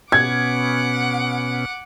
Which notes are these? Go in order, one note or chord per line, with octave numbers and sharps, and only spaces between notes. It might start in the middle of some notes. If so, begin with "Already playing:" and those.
B2 B3 C#4 F#5 D6 G#6